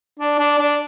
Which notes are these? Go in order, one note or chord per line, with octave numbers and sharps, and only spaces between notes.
D4
D4
D4